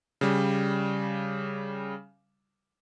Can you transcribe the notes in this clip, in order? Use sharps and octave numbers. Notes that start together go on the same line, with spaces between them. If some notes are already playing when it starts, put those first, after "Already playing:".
C#3 G3